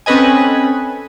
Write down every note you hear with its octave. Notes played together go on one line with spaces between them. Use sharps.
C4 C#4 A4 B4 D#5 G#5